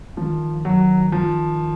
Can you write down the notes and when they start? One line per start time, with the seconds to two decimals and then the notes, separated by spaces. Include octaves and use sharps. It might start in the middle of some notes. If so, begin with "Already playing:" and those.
0.17 D#3 F3
0.65 F#3
1.12 F3